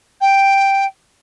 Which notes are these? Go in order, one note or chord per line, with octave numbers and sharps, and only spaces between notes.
G5